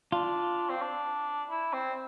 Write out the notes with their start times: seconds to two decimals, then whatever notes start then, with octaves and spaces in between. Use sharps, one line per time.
0.12 D4 F4
0.69 C4
0.82 D4
1.50 E4
1.73 C4